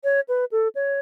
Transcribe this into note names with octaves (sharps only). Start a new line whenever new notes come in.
C#5
B4
A4
C#5